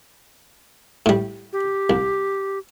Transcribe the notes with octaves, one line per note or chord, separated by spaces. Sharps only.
A2 G3
G4
C2